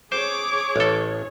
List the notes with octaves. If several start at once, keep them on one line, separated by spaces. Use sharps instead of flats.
G#4 C5 C#5 D6
A1 A4